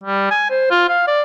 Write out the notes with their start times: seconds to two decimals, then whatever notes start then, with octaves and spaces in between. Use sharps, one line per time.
0.04 G3
0.31 G#5
0.50 C5
0.71 F4
0.89 F5
1.07 D5